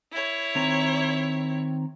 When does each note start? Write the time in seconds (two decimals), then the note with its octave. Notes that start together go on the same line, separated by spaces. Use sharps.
0.12 E4 C#5
0.55 D#3 C4 A#5